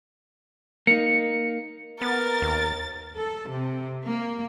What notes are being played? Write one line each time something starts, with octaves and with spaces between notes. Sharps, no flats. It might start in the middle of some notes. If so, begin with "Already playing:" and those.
A#3 D#4 C#7
B3 A#4 A6
D#2
A4
C3
A#3